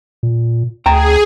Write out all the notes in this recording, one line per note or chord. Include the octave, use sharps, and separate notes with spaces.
A#2
D2 G#4 G5 A#5